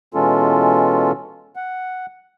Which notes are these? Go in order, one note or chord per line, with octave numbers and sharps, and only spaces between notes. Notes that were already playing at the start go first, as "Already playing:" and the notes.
B2 E3 G#3 C#4 F4 A4
F#5